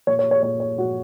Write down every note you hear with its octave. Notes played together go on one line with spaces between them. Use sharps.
A#2 C#5
C#5
C#5
A#2 C#5
C#5
A#2 F#4